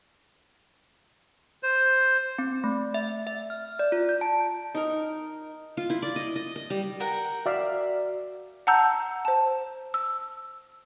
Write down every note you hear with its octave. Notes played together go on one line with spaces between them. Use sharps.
C5
C4
A3
E5
E5
F6
D5
F4
G6
A5
D#4 A#4
F4
E4
D5
D#5
D#5
D#5
G3
A#4 F#5 G5
F#4 D5 E5 F5
F#5 A5 A#5 E6 G6
C5 A5
E6